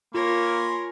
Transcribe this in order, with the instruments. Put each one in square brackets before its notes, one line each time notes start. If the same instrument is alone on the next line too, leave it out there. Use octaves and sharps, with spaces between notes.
[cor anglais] A#3 [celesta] F4 [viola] A#4 C#5 [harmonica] G#5 B5 C6